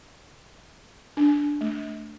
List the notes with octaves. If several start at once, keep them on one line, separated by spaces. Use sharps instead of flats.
D4
A3